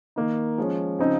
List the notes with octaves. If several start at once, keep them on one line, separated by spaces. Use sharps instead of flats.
D#3 A#3 D#4
F3 G#3 C#4
C#3 F3 C4 D#4